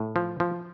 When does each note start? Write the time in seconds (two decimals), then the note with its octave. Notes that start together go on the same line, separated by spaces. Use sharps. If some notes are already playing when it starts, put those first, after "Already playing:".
Already playing: A2
0.16 F3
0.40 F3